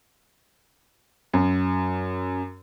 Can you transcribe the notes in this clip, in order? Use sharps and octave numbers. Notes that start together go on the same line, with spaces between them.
F#2